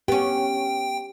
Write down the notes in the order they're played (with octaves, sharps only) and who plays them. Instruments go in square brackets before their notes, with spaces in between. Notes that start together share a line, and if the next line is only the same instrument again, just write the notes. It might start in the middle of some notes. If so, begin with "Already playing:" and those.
[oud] B3 C#4 [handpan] G4 [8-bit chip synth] G5